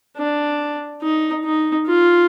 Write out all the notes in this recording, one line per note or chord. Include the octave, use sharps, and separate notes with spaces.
D4
D#4
D#4
F4